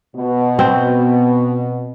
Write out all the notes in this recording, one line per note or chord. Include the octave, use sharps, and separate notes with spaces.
B2
C4